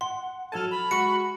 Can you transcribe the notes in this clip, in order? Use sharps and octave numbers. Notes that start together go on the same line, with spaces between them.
F#5 C6
F#3 A4 A5 F6 G#6 D#7
B5
G#3 F#4 C#6 C#7